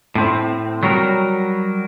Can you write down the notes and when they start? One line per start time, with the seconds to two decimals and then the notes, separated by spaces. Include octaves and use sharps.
0.15 A2 C4
0.83 F#3 G3 F#4 A#4